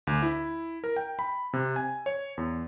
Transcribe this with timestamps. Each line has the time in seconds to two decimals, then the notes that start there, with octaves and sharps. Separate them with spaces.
0.07 D2
0.22 E4
0.84 A#4
0.96 G5
1.19 B5
1.53 C3
1.76 G#5
2.06 C#5
2.38 E2